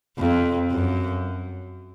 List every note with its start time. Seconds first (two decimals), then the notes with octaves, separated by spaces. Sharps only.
0.18 F2
0.71 F#2